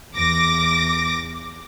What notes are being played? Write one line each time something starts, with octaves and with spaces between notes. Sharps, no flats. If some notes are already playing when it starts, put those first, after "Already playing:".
E2 D6 A#6